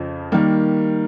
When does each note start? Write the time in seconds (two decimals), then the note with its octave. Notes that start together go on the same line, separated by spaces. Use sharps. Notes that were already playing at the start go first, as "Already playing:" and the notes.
Already playing: F2 C#3 F3
0.32 D#3 G3 A#3